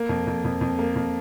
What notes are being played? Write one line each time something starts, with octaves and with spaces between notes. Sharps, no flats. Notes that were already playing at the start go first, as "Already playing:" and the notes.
Already playing: A#3
F2
F2
F2
F2
A#3
F2